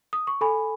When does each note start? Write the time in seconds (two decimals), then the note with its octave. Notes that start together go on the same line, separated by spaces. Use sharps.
0.13 D#6
0.27 C#6
0.41 A4 G#5 B5